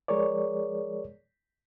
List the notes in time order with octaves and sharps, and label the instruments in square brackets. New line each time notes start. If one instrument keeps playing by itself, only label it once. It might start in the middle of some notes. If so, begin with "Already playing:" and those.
[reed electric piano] F3 G#3 G#4 A#4 C#5 D5